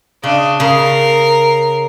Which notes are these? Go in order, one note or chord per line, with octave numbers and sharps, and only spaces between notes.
C#3 D4 D#5
C#3 A#4 C7